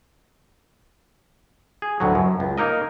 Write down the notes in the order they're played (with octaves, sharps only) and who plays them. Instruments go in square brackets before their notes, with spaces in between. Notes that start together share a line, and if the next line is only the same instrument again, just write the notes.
[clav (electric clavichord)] G#4
D2 A2 F#3
F#2
C#2
A#3 D#4 A#4 D#5